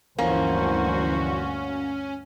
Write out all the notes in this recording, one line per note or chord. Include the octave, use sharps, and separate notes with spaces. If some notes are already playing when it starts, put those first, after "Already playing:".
D2 G2 E3 F3 A#3 C#4 F#4 C5